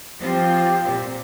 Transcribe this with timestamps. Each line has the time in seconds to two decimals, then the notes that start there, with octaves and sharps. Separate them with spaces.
0.21 F3 C4 F4 G4
0.84 A#2 C4